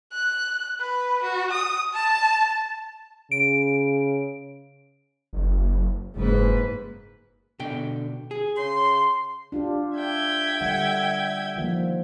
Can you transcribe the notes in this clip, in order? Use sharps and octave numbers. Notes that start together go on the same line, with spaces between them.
F#6
B4
F#4
D#6
A5
C#3 D7
F#1
F#1 G#2 A#3 B4
B2 D3 G5
G#4
C#3 C6
D4 F4 G4
E5 G5 G#6
D3 G3 F#5
D#3 F3 A#3